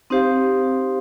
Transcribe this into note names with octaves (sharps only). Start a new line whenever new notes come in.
C4 D#4 G4 C5 F5